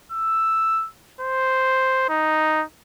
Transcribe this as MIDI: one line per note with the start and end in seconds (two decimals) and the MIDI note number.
0.12 0.88 88
1.21 2.07 72
2.09 2.64 63